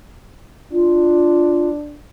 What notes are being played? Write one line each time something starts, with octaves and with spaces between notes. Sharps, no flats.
D4 F4